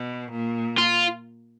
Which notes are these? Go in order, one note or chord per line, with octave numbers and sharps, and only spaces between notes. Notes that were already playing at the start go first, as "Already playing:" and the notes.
Already playing: B2
A#2
F4